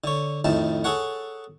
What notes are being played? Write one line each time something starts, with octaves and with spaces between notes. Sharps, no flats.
D3 C#5
F2 A2 D#3 A5
G#4 A4 C#5 F#5